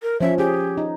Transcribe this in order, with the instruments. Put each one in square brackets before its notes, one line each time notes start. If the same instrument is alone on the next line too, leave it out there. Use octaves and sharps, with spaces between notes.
[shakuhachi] A#4
[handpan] F3 C#4 [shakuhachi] E5
[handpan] C#4 G#4 [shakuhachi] G4
[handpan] D#4